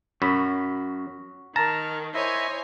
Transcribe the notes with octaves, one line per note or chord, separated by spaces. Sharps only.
F#2 F#4 B5
D#3 A5 A#5 F6
E4 C5 C#5 D#5 E5 G#5